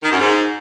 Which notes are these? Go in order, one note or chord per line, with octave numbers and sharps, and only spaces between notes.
D#3
F#2
G#2